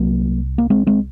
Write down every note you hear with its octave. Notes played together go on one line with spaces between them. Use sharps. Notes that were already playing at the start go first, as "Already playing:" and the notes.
Already playing: C2 C3 F#3 A#3
A#3
G#3 C4
G#3 C4